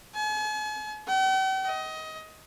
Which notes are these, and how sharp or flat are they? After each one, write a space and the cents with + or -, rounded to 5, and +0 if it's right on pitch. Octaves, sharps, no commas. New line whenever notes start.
G#5 +45
G5 -45
D#5 +20